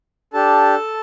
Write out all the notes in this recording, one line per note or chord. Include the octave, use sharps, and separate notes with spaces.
D4 G4 A4 A5